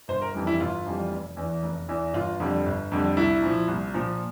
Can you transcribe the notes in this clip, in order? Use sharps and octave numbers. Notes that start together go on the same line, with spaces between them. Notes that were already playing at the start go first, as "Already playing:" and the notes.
G1 C5
A#4
F2 E3 G3
E4
G1 F4
F2 E3 G3
F1
E2 E3
F1
E2 E3
G1 F4
F2 D3 G3
G1
F2 D3 G3
C2 E4
A#2 F3
C2
A#2 F3